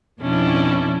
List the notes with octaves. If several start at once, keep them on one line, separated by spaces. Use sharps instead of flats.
F2 B2 C#4 D4 E4